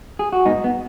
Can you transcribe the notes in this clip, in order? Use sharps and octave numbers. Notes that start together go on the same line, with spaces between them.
G#4
F#4
G#2 B3 D#4
B3